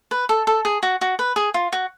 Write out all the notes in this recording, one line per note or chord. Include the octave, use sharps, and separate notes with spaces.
B4
A4
A4
G#4
F#4
F#4
B4
G#4
F4
F#4